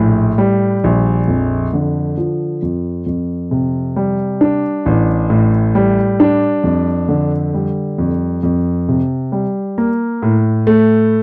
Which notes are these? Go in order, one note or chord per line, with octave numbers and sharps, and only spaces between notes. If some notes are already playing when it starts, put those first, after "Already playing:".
Already playing: A#1 A2
G3
A#1
F2
D3
F3
F2
F2
C3
G3
D4
A1
A2
G3
D4
F2
D3
G3
F2
F2
C3
G3
A#3
A2
A3